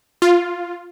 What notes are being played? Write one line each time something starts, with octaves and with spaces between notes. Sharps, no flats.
F4